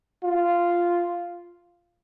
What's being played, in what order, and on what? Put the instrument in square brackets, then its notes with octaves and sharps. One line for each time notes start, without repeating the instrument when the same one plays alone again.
[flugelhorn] F4